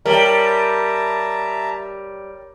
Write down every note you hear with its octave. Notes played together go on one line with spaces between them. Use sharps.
G3 A#4 C#5 E5 G5 A5 A#5